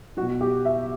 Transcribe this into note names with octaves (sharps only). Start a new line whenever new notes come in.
B2 F#3 F#4
G4
E5